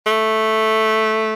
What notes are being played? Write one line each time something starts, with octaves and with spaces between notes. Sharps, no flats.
A3